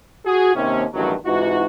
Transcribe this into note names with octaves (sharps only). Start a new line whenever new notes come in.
F#4 G#4
D#2 C3 C#4
A1 E2 G2 D#3 F#3
G#2 C3 E3 D#4 F4 F#4